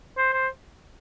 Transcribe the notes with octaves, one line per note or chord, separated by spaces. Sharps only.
C5
C5